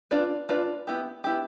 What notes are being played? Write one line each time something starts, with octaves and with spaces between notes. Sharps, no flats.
D4 F4 B4 D5
D4 F4 B4 D5
B3 E4 G4
B3 E4 G4